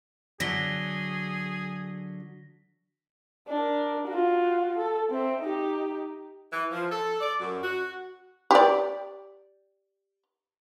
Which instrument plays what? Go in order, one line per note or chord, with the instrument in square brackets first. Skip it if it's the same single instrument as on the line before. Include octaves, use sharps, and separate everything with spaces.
[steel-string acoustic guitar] D3 F#3 [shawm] G#4 [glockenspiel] A#6 B6 G7
[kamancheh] D4 A#4
F4 F#4
A4
C4 E5
D#4 G4
[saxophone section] E3
F3
A4
D5
F#2
F#4
[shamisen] G4 D5